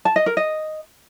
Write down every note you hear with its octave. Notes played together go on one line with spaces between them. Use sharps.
A5
D#5
A#4
D#5